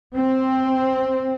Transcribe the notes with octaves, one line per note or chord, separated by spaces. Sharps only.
C4